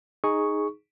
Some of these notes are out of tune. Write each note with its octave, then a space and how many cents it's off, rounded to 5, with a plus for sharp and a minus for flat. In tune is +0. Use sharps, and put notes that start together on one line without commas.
D#4 +0 G#4 +0 C#6 +0